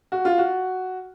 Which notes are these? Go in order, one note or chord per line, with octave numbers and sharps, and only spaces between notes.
F#4
F4
F#4